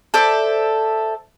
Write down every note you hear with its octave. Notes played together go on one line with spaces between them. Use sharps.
A4 C5 D5 E5